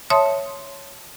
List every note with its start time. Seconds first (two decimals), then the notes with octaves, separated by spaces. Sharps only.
0.10 C#5 E5 A5 C6 D#6